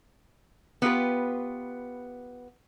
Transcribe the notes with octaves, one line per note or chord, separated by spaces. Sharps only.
B3 F4 G4 B4